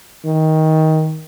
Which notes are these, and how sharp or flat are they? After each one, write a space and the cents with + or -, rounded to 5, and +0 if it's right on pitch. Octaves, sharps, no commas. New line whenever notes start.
D#3 +20